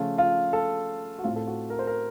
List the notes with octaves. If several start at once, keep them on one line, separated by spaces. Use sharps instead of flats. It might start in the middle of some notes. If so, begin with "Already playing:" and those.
Already playing: C#3 F3 A3 C#4 F4
F4
A4
F#4
A2 A3 C4 F4
A4
F#4
A#4
C5
A#4